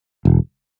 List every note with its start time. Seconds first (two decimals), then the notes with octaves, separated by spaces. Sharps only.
0.25 E1